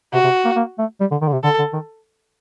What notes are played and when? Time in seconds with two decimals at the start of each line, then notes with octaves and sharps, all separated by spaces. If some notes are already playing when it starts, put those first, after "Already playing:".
0.13 C3 F#4
0.24 C3
0.45 A#3
0.56 A#3
0.79 A3
1.00 G3
1.11 D3
1.21 D#3
1.28 D3
1.33 C3
1.43 D3 A4
1.59 D3
1.73 D#3